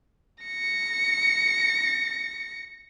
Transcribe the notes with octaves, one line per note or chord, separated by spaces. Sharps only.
A#6 C#7